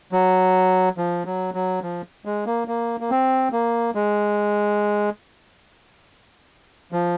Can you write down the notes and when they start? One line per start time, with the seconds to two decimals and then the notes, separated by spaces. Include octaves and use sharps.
0.12 F#3
0.98 F3
1.26 F#3
1.54 F#3
1.83 F3
2.25 G#3
2.46 A#3
2.68 A#3
3.00 A#3
3.10 C4
3.52 A#3
3.95 G#3
6.92 F3